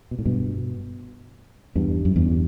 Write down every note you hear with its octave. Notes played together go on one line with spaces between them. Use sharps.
B2
A2
G2 B2
E2 G2
F#2
E2 G2